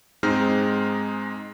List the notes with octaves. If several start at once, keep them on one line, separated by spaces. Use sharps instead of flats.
G#2 G#3 C4 D#4 F6